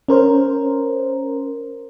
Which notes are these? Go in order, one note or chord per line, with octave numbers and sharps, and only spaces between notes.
C#4 A#4 C5